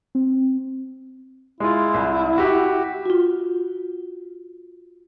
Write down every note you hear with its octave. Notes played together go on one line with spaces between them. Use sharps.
C4
G#3 E4 F4
C2
F#4 G4
F4 F#4